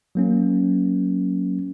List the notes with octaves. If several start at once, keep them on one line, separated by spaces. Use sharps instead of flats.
F#3 A#3 C#4